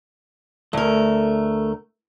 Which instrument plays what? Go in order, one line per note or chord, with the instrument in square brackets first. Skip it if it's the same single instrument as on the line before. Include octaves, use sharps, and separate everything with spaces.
[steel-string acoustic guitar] D2 A#4 [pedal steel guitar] A3